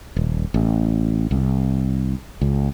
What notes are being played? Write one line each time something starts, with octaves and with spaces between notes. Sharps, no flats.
D#1
A1
C2
C#2